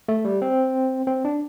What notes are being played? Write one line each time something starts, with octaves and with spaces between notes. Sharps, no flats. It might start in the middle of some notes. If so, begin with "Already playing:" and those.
A3
G3
C4
C4
D4